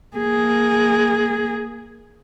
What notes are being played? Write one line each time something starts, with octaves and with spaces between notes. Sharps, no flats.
A#3 G#4